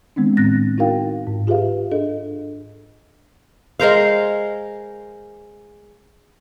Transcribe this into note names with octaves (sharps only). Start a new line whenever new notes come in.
D#3 G#3 B3 C4 D4
A2 C4 F#6 A6 A#6
D#4 E4 F#4 A#4 F5 G5
G#2
F4 G4 G#4 B4 E5 F5
D4 G#4 A4 D#5
G#3 A#4 C5 F5